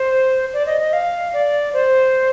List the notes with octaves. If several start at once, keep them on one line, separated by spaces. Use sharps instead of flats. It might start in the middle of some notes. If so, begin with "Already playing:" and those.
Already playing: C5
D5
D#5
D#5
F5
D5
C5